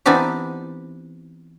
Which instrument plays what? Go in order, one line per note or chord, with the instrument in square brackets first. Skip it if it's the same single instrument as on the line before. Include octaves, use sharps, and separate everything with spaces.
[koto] E3 B3 C4 D4 D#4 G4